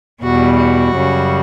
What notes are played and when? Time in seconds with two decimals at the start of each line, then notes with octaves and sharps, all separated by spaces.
0.23 E2 B2 G3 F#4
0.59 F#4
0.95 F#2 C#3 G3